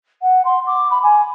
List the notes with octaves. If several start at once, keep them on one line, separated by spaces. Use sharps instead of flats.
F#5
C6
D6
B5
G#5